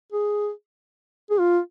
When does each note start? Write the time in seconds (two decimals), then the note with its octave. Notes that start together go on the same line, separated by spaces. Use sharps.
0.12 G#4
1.30 G#4
1.40 F4